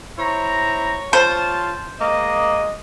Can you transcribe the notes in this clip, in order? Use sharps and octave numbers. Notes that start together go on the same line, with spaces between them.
E4 C5 C#5 A#5
F4 C5 A5
G#3 A#3 D#5